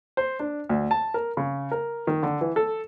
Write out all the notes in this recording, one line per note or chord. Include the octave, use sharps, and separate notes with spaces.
C5
D4
D2
A5
A#4
C#3
A#4
D#3
D3
E3
A4